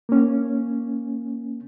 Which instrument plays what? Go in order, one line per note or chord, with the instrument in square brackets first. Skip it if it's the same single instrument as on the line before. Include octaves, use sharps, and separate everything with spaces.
[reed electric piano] A#3 C#4